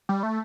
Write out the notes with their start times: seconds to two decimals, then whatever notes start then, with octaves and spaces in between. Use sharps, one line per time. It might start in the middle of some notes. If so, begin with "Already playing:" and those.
0.09 G3
0.23 A3